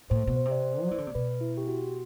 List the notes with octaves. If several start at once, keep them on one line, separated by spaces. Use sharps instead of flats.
A2 C5
B2
C5
C3
D5
C5
F#3
E3 D5
D3
C3
B2 B4
E4
G4
F#4